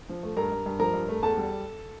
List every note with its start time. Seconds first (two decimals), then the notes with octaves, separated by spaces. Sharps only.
0.09 F3
0.23 A3
0.37 G2 A#4 A#5
0.52 G2
0.66 G2
0.79 F3 A#4 A#5
0.93 G2
1.09 A3
1.23 E2 A4 A5
1.37 G3